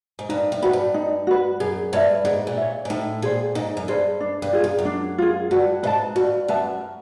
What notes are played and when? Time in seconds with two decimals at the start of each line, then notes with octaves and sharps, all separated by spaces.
0.19 G#2
0.29 G2 D#4
0.52 A2
0.62 G#2 F#4 B4
0.73 G2
0.94 D#4
1.27 F#4 B4
1.60 F#2 G#4
1.93 G2 C#5 E5
2.25 G#2 G#4
2.47 A#2
2.57 C#5 E5
2.85 G#2
2.90 A2 D#4
3.22 A#2 G#4 C5
3.55 G#2 D#4
3.77 F#2
3.88 G2 G#4 C5
4.20 D4
4.42 G2
4.53 F4 G#4
4.64 F#2
4.79 F#2
4.85 D4
5.18 F4 G#4
5.51 G2 F#4
5.83 G#2 B4 E5 A5
6.16 G2 F#4
6.48 F#2 B4 E5 A5
6.80 A#4